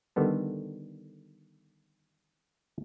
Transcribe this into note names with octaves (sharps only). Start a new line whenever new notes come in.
D3 D#3 G3 B3 A4